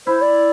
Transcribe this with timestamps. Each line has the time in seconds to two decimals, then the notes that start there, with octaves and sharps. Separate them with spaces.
0.07 E4 C5
0.21 D5